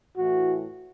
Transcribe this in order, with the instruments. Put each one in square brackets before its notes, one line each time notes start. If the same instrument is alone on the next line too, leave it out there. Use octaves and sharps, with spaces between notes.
[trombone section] A2 E3 F#4